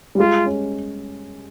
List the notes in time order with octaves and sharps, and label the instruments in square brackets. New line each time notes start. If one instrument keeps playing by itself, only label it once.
[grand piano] G3
[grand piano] G#3 [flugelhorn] F4
[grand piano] C#4